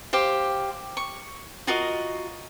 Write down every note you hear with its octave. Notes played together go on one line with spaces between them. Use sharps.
G4 C5 F5
C#6
F4 F#4 A#4 D#5